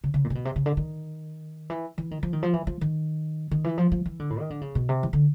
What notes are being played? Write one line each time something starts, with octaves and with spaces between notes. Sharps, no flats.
C#3
C#3
A#2
C3
B2
C3
C#3
D3
D#3
E3
E3
D#3
F3
D#3
F3
E3
F3
D#3
D#3
E3
F3
F3
E3
D3
A2
D#3
D3
C#3
B2
C3
E3
D3